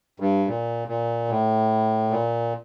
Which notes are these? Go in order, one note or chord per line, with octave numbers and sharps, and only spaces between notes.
G2
A#2
A#2
A2
A#2